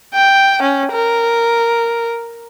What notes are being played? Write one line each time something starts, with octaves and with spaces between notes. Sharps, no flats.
G5
C#4
A#4